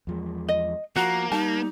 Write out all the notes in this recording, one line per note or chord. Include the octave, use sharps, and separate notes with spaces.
E2 F3 G#3
D#5
F3 A#3 F#4 A#5
G3 D#4 A5